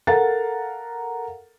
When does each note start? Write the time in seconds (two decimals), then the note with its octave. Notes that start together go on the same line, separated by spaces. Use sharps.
0.07 A4 A#4 F5 F#5 A#5 A6